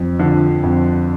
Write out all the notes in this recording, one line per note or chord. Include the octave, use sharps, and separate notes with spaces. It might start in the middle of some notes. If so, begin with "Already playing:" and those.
Already playing: F2
D3 F3
F2